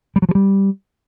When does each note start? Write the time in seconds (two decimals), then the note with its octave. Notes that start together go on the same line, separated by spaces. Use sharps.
0.16 G3
0.22 F#3
0.29 F3
0.35 G3